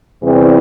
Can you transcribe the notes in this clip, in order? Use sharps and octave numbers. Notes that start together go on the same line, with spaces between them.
E2 C3 E3 G3 C4